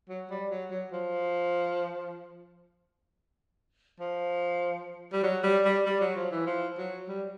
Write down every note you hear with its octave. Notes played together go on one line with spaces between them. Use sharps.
F#3
G3
F#3
F#3
F3
F3
G3
F#3
G3
G3
G3
F#3
F3
E3
F3
F#3
G3